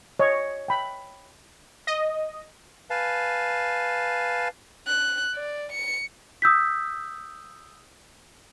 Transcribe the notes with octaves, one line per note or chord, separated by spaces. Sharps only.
C#5 D#5
G5 B5
D#5
B4 F5 G#5 A5
F#6
D5
C#7
D#6 E6 G6 B6